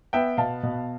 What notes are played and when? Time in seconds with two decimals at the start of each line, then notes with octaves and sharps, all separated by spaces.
0.13 B3 E5 G5
0.37 B2 F5 A5
0.63 B2